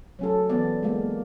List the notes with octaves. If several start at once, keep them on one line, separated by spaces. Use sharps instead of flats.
F#3 C#4 A4
E3 B3 D5
G#3 A#3